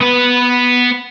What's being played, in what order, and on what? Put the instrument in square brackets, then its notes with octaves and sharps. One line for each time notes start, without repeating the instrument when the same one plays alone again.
[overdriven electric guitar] B3 B4